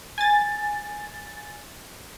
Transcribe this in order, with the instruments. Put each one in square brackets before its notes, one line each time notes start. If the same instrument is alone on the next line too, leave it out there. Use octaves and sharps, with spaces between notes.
[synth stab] G#5 A6